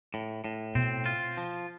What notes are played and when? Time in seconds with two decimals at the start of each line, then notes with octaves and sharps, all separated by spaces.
0.14 A2
0.44 A2
0.75 B2 C4
1.06 F4
1.37 F3